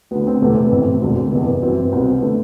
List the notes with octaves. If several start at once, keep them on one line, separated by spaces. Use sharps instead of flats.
D2 D3 B3
C4
E1 E2 C3 E3 A3
B3
A1 A2 E3 C4
E1 D2 D3
F#1 E2 C3 E3
B3
G1 F#2 E3 C4
B3
C2 B2 C4
B3
D3 A3